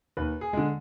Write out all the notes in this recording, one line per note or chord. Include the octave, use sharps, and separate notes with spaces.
D#2 B4
G#4
D3 G#3